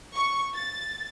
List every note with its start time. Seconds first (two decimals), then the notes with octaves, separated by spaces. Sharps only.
0.15 C#6
0.54 A6